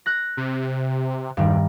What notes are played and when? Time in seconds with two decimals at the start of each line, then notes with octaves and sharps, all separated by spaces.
0.06 F#6 A#6
0.37 C3
1.37 E2 G2 D#3 G3